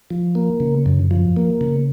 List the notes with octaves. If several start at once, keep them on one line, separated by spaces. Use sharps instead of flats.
F3
A#3
C#3
F#2
F3
A#3
C#3